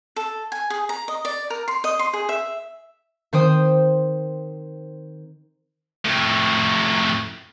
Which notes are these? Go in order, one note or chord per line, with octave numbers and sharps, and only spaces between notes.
A4
G#5
G#4
A#5
D#5
D5
A#4
C6
D#5
C6
G#4
E5
D#3 C4 C5 G5 D#6
F2 A2